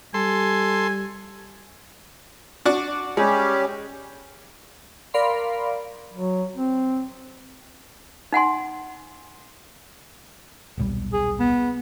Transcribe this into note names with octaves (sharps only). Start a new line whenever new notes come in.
G3 A4 G#5 C6
D4 F#4 D5
G3 G#3 C#4 G4
A#4 D5 F5 B5 C6
F#3
C4
D#4 F#5 G#5 C6
D#1 B1 G3
G#4
B3